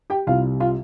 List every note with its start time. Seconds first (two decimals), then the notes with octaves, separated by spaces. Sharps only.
0.10 G4 G5
0.27 C2 C3 G3 F4 F5
0.60 F4 F5